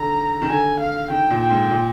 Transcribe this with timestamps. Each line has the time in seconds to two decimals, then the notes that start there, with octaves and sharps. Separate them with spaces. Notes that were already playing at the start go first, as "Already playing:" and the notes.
Already playing: D3 D#3 A#5
0.42 D#3
0.49 D3 G#5
0.80 F5
1.10 D#3 G5
1.30 A#2
1.41 G5
1.50 G#2
1.71 A#2